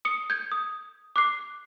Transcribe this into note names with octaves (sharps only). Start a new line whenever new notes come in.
D#6 C#7
G6 G#6
D#6
D6 F#6 C7